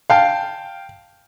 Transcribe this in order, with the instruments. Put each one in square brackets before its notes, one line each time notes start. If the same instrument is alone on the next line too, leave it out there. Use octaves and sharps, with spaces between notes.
[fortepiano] F5 G5 A5